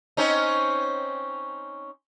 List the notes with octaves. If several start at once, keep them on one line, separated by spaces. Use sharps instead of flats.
C4 C#4 D#4